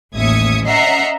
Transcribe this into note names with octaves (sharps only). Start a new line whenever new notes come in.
A1 D#2 E5 D#6 G#6 C#7
C#4 D#5 E5 F#5 A#5 C7